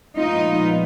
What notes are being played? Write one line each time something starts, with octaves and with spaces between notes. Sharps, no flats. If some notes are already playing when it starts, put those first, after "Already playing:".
A#2 F3 G#3 B3 D#4 F4